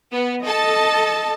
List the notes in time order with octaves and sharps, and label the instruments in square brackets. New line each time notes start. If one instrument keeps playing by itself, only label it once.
[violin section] B3
[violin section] A4 A5 [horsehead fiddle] D#5